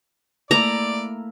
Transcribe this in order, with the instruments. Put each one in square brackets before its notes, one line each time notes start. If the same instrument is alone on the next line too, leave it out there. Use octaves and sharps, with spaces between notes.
[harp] A3 A#3 E4 [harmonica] D5 [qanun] A#5